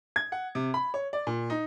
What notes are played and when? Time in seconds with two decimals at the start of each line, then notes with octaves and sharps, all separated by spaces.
0.16 G#6
0.32 F#5
0.55 C3
0.74 B5
0.94 C#5
1.13 D5
1.27 A#2
1.50 D#4